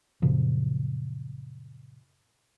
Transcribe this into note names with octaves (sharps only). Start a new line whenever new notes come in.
F#2 A#2 C#3 F3